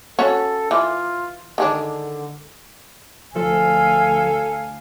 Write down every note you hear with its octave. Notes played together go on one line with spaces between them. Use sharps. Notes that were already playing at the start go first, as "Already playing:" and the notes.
C#4 F#4 A4 C#5
E3 F4
D3 D#3 G#3 D4
D2 F3 A4 F5 G#5